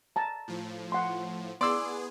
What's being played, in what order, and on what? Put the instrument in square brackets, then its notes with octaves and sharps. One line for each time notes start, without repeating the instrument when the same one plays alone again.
[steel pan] A5 A#5
[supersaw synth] A2 F3
[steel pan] F#5 C6
[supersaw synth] B3 G#4 [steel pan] E4 C6 [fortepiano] D5 E6